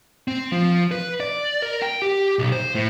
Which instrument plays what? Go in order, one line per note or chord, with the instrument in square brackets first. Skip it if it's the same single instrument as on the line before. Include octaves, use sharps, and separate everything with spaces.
[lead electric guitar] C4
F3
B4
D5
A#4
G5
G4
B1
C5
A2